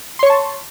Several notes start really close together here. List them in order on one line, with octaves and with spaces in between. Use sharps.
C6 C#5 C#6 A5